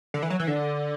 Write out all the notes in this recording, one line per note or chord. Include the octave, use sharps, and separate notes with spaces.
D3
E3
F#3
E3
D3